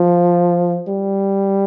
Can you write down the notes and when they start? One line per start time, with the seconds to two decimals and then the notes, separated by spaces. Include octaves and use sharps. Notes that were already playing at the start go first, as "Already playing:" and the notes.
Already playing: F3
0.88 G3